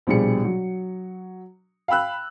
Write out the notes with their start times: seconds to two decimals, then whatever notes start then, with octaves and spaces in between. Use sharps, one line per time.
0.07 A#1 B2 G3 G#4 C#7
0.44 F#3
1.88 F5 G5 B5 E6 F#6